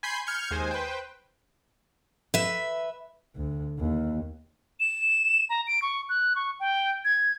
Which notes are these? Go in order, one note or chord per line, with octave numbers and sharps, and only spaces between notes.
G#5 B5 C6 G6 C7
F6 G6 G#6 C#7
D#2 G#3 C5 G#5
B4 C5 G5
B4 E5
D2
D#2
E7
A#5
D7
C#6
F#6
C#6
G5
G#6